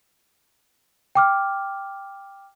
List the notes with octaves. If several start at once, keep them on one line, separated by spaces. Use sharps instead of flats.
G5 D6 F6